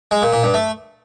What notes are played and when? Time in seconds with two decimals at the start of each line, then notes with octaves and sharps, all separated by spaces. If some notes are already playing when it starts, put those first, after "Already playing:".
0.11 G#3
0.22 A#2
0.33 A#2
0.43 G2
0.54 A3